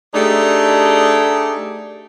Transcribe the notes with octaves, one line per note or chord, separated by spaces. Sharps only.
A3 D4 D#4 G4 G#4